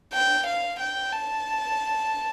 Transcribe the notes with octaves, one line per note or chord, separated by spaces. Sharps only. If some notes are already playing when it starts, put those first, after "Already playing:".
G5
F5
G5
A5